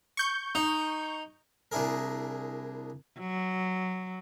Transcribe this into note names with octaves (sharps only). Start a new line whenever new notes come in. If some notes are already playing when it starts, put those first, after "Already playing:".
C#6 G6
D#4
C2 D4 E4 G#4 A#4
F#3